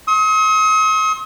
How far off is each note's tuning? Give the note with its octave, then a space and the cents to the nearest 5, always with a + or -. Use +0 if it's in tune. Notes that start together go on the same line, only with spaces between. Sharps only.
C6 +40 D#6 +45